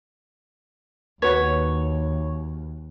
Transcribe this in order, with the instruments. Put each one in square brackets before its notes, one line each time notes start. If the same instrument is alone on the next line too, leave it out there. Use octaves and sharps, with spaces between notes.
[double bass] D#2 [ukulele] F#4 B4 [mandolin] C#5